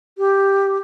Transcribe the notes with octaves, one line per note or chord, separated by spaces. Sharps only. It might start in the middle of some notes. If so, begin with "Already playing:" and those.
G4